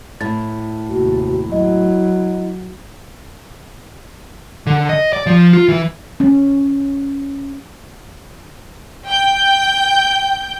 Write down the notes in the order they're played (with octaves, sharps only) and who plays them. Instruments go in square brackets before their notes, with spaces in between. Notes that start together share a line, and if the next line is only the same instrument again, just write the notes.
[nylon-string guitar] A2 [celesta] A6
[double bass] D#2 C3 [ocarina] F#4
[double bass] F#3 [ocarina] E4 [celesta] D#5
[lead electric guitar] D3
D#5
D5
F3
F4
E3
[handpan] C#4
[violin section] G5 G6